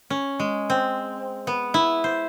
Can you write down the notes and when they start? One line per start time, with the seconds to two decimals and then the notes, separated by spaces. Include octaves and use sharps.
0.10 C#4
0.40 G#3
0.70 C4
1.47 B3
1.74 E4
2.04 C5